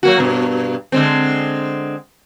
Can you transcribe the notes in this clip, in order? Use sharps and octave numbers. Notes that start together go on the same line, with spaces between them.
F#3 A#3 F#4
G2 B2
D3 G#3 C4